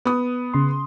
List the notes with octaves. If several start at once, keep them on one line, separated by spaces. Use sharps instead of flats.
B3 D#6
C#3 C6